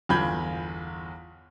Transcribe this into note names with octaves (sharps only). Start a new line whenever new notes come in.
G1 E2 F4 B5 G6 G#6